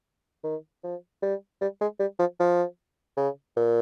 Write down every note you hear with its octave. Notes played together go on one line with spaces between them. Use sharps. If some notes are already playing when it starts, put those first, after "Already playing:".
D#3
F3
G3
G3
G#3
G3
F3
F3
C#3
A#2